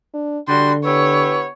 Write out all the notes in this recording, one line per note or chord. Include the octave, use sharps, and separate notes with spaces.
D4
D3 G3 D4 F#4 C6
B3 E4 G4 B4 C#5